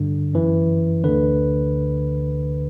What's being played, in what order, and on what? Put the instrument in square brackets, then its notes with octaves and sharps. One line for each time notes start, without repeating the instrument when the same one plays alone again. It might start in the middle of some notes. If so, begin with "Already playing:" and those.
Already playing: [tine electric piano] G2 D3
F#2 E3
D2 D3 B4